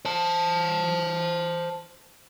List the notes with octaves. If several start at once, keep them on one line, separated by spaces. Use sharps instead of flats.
C5 A5